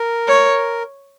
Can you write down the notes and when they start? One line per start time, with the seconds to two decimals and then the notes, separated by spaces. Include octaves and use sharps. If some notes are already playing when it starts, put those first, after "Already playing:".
Already playing: A#4
0.28 C#5